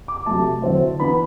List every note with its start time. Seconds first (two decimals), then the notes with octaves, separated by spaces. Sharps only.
0.08 D6
0.26 C3 F#3 A3 A5
0.62 D3 F#3 C4 E4
0.99 E3 B3 D4 B5